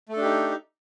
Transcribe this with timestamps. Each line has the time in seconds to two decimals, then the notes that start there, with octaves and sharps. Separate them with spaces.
0.09 A3
0.13 A4
0.17 D4
0.21 G4
0.25 D#4